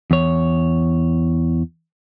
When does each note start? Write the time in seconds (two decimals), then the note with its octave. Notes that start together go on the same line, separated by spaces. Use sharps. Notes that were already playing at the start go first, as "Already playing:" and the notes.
0.11 E2 C#5